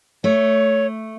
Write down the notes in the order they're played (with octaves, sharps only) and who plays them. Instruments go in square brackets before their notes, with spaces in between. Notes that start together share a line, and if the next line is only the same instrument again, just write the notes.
[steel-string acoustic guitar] A3 [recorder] C#5